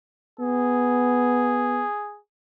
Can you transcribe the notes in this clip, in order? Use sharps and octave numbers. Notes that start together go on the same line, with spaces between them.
B3 G#4